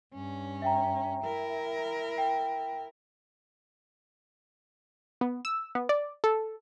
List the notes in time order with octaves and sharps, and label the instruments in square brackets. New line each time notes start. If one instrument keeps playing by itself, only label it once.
[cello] G2 C#4
[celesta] E5 G5 A#5
[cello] E4 A#4
[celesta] G5
[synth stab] B3
E6
B3
D5
A4